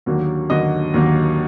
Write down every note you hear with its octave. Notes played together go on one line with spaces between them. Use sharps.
D#2 D3 F#3 A#3
D#2 D3 F#3 A#3 D#5
D#2 D3 F#3 A#3